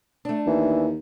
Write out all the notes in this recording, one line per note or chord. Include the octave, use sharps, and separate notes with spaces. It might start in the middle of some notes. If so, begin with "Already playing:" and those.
A3 D4
D#2 E3